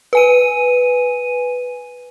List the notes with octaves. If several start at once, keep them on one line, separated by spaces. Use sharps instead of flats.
B4 G#5 D#7